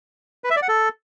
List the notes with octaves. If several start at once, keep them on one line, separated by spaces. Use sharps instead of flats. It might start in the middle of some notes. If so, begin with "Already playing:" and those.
B4
E5
D5
F#5
A4